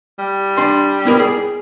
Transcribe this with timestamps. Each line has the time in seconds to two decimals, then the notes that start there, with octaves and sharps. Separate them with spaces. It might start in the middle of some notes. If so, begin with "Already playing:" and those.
0.19 G3
0.57 D4 C6
1.05 B3 E4 A#4
1.20 G#4